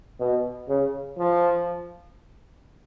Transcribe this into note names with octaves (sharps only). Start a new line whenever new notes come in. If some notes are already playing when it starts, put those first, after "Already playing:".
B2
C#3
F3